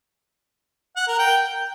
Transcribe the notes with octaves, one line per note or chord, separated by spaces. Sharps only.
F#5
A#4
G5